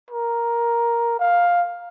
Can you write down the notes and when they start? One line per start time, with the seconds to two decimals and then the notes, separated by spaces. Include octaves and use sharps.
0.11 A#4
1.19 F5